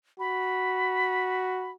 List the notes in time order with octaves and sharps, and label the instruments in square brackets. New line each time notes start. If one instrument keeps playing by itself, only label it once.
[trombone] F#4 [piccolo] B5